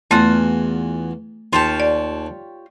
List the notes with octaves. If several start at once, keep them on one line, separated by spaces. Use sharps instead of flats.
E2 A3 F4 F#4
D#2 F4 G4 C#5 A5
D5